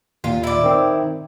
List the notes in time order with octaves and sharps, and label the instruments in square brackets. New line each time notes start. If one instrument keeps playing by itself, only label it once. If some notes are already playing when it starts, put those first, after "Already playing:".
[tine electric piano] D#2 A#2 [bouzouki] F4
[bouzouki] E4 D5
[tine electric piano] D#3 C4